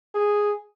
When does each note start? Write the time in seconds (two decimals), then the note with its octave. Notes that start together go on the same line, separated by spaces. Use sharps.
0.15 G#4